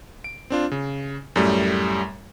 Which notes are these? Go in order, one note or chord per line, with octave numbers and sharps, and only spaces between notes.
D7
C4 D4 F4
C#3
F#2 A2 G3 A3